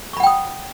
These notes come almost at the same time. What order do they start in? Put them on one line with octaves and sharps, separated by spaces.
C#6 B5 F#5 G5 D#6